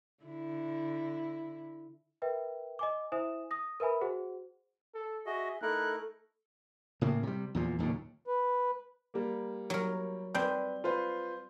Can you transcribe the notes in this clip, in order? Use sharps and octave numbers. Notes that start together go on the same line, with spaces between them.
D3 E4
A#4 B4 E5 G5
D#5 G#5 D6
E4 C5 E5 G#5 D#6 E7
D#6 A#6
A#4 B4 E5 G#5 B5
F#4 G#4 C5 F#5
A4
F#4 G#4 D#5 E5
A3 D#4 E4 A4 A#4 F#6
A2 C#3 A#3
C3 G3
E2 A#2 F3
D1 D#2 A#2 C#3
B4
G3 A#3
F#3 A#4
G3 C4 B4 G6
F4 B4 C5